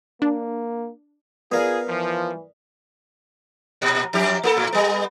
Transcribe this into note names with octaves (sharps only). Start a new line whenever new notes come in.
A#3 D4
B3 F4 G#4 A#4 D5 F5 D#6
E3 F3
A#2
F2 G4
A#3 G#4 A4
A2
G3 B3